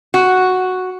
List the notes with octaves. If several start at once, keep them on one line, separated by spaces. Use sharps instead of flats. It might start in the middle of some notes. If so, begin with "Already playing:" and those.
F#4